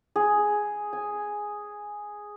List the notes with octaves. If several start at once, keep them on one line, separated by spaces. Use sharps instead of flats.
G#4
G#5